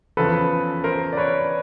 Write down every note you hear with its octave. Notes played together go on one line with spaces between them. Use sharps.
E2 C#3 F3 A4 B4
A#4 C5
D5
B4 C#5